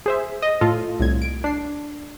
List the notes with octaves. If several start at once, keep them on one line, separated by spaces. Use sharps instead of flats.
G#4 C5 E5
D#5
A2 F4 A4
C2 A2 G#6
D7
D4 C7